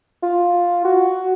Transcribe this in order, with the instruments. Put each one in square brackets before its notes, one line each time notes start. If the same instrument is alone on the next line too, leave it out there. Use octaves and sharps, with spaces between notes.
[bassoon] F4
F#4